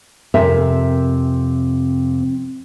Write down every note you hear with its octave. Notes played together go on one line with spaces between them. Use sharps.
F2 C3 C4 A#4 E5 G#5